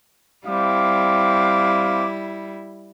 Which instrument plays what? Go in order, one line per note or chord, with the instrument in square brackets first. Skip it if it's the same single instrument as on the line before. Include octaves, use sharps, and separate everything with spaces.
[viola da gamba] G3 E4 [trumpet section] C4 F5 D6